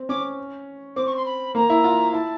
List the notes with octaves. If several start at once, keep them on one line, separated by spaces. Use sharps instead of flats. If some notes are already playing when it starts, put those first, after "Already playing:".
Already playing: C4
C#4 D6
C4 D6
C#6
C6
B5
A#3 A#5
E4
F4
E4 A5